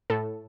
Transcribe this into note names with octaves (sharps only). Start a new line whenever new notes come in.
A2 A4